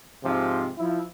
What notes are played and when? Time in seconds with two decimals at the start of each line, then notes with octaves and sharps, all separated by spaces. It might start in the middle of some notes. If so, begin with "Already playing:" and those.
0.24 G#2 C3 F3
0.77 F3 E4